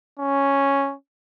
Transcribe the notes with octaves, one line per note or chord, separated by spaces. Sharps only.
C#4